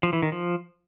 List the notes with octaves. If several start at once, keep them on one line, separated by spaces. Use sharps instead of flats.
F3
E3
D#3
F3